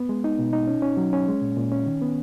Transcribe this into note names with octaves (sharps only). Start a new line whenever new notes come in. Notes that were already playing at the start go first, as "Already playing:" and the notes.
Already playing: B3
G#3
D#4
B2
D#4
C#4
C#4
F#3
C#4
G#3
A#2
A#2
C#4
D#3
B3